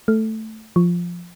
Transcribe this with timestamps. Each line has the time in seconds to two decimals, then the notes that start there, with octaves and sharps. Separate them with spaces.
0.08 A3
0.76 F3